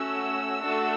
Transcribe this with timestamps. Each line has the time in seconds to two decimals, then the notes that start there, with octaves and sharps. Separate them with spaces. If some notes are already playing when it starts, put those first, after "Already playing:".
Already playing: A3 C#4 F#4 E6
0.61 A3 D4 F#4 A4